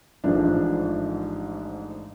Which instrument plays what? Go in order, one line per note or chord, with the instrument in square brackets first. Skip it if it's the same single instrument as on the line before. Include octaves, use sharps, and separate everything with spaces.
[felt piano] A1 G#2 F3 D4